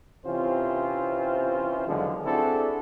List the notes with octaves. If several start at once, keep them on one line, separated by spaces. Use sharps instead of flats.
C3 E3 C4 C#4 F4 C5
E2 D3 D#3 F3 F#3 G#3
C4 D4 E4 F#4 G#4 A4